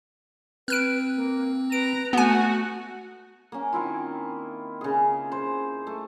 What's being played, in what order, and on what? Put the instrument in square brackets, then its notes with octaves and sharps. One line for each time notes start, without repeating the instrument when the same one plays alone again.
[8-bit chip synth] C4 [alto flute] B4 [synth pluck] F6 F#6 D7
[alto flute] A#3
[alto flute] B4 [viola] A#5 [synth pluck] D7
[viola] A3 F#4 [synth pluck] B3 G#5 [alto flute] F#5
[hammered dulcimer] A#3 C#4
D#3 C4 E4 F4
C#3 G#4
C5
A3